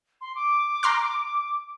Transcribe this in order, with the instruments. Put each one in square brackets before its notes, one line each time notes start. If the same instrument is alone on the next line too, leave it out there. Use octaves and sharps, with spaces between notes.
[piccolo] C6
D6
[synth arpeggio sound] A#5 C6 F6